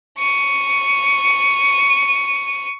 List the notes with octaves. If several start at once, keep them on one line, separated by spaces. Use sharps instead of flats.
C#6 D#7